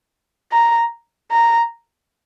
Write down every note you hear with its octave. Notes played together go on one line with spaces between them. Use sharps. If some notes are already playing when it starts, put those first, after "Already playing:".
A#5
A#5